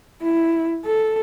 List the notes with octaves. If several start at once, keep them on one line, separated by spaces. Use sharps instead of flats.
E4
A4